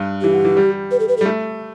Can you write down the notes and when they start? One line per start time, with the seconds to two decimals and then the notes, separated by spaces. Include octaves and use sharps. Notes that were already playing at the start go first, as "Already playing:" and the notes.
Already playing: G2
0.22 E3 G4
0.33 D3
0.45 E3
0.57 G3
0.91 B4
1.00 A4
1.08 B4
1.17 A4
1.21 G3
1.25 A3